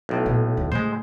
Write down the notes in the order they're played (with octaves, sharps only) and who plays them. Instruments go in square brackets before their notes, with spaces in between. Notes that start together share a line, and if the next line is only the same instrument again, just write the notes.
[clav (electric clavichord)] B1 A2
[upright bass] A#2 B3
D#2
[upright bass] A2 C#3 [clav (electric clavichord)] G#3 C5